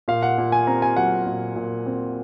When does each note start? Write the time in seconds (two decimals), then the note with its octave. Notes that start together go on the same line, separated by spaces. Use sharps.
0.08 A#2 F5
0.23 F#5
0.38 A#2
0.52 G#5
0.67 C4 A#5
0.82 G#5
0.97 F#3 F#5
1.26 A#2
1.56 A#2
1.86 C4